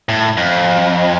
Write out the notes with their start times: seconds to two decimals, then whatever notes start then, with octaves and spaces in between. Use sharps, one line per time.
0.09 A2
0.37 F2